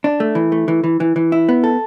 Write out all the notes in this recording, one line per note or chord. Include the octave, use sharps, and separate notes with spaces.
D4
A3
E3
A3
E3
E3
E3
E3
E4
B3
A4